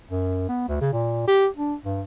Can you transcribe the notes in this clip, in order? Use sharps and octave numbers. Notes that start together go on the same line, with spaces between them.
F#2
B3
D2
C#3
A#2
G4
D4
G2